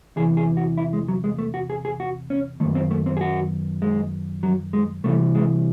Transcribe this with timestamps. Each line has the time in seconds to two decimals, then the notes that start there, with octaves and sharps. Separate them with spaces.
0.17 E2 C3 E3 G#4
0.37 G#4
0.57 F#4
0.77 E4
0.93 G#3
1.08 F#3
1.24 G#3
1.39 A3
1.54 F#4
1.70 G#4
1.85 G#4
2.00 F#4
2.30 C#4
2.60 D#3 A3
2.65 F#2
2.75 C4
2.91 A3
3.06 C4
3.17 G#4
3.21 F#4
3.82 G#3
4.43 F#3
4.73 G#3
5.04 C2 C3 E3 A3
5.35 G#3